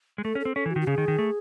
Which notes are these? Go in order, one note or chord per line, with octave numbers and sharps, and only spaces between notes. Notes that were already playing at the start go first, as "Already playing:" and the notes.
G#3
A3 A4
C#4
C4 A4
C#4 A4
E3
F#4
D#3
F#4
C#3 G#4
D#3
D#3
A3